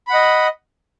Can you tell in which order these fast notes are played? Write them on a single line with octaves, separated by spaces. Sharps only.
B5 F#5 D#5